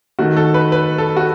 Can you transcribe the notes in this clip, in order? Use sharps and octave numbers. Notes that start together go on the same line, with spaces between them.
D#3 A3 F#4
A4
B4
B4
A4
F#4